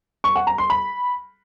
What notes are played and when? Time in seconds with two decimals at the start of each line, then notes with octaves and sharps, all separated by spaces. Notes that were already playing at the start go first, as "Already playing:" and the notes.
0.24 C#6
0.35 F#5
0.47 A#5
0.58 C6
0.70 B5